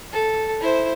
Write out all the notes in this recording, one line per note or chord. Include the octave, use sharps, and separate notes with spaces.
A4
E4 C5